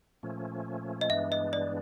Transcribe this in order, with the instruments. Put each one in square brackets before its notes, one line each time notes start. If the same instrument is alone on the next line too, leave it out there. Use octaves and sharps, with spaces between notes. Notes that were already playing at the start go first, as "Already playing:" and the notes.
[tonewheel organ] A#2 F3 A3 C#4
[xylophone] D#5
[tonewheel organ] G2 E3 G#3 B3 D4 [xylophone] E5
[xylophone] D#5
D5